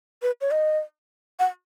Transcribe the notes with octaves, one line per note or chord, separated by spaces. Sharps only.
B4
C#5
D#5
F#5